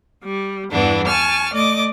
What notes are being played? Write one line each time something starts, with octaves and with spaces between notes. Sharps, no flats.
G3
E2 G2 E3 B3 D4
G#5 A5 C#6 F6
A3 D5 D#5 D6